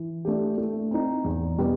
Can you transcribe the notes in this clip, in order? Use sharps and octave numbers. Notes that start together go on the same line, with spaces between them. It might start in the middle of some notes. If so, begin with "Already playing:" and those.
Already playing: E3
A3 D4 G4
A3
C4 D#4
E2
B2 G3 B3